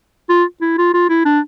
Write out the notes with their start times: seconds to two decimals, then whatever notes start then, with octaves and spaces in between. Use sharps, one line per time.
0.29 F4
0.61 E4
0.78 F4
0.94 F4
1.09 E4
1.25 D4